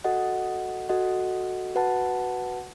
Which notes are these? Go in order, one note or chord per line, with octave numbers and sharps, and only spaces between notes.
F#4 A4 D#5 F#5
F#4 A4 D#5 F#5
F#4 B4 F#5 A5